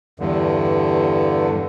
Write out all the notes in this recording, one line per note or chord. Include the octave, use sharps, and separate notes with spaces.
E2 G2 D3